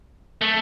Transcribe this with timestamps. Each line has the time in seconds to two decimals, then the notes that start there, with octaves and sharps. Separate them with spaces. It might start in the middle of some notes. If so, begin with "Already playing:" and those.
0.41 A3